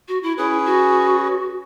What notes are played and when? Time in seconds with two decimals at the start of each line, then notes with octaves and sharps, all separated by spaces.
0.08 F#4
0.23 E4
0.38 C#4 E4 G#4 B4
0.66 F#4